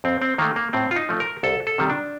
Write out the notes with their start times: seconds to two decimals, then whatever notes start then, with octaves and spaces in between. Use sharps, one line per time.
0.04 F2 C4
0.22 C4
0.38 D#3 A3 A#3
0.56 A#3
0.73 A2 C4
0.91 F4
0.96 D#4
1.09 F3 A3
1.20 A#4
1.43 C2 A4
1.67 A4
1.78 C3 D#3 G3
1.90 D4